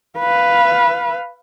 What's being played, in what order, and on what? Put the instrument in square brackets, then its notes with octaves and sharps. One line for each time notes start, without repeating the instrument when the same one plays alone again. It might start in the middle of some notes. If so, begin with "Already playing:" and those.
[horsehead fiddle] B4 F5